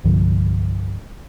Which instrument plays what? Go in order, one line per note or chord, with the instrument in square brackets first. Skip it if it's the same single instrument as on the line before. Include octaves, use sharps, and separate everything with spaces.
[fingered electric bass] C2 G2 D3 F3